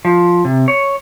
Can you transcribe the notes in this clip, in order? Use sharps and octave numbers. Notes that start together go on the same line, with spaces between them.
F3
C3
C#5